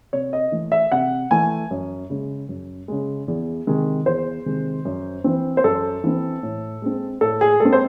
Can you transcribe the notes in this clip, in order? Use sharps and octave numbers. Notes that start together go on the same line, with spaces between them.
C3 C#5
D#5
E3 A3
E5
C3 F#5
E3 A3 G#5
F#2
C#3 G#3
F#2
C#3 G#3
E2
C3 D#3 G#3
E2 C5
C3 D#3 G#3
F#2
E3 C4
C5
F#2 A4
E3 C4
A2
G#3 C4
A2 A4
G#4
G#3 C4 A4
C5